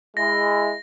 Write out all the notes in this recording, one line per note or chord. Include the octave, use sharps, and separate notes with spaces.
G#3 E4 A#6